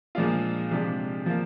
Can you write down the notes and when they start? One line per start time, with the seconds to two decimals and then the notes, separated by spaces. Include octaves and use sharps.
0.15 A#2 F3 G#3 D4 F4
0.71 C3 F3 G#3 D4
1.26 F3 A#3 F4